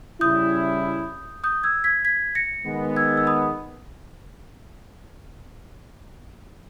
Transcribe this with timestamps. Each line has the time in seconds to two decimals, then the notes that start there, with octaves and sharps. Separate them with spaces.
0.21 C#3 G3 C#4 E4 D#6 G6
1.44 D#6 G6
1.63 E6 G#6
1.84 G#6 B6
2.05 G#6 B6
2.35 A#6 C#7
2.65 D#3 G#3 B3
2.96 E6 G#6
3.17 E6
3.27 B5 D#6